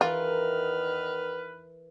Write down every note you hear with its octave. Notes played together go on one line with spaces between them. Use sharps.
E2 D#3 E3 F4 A#4 B4 F6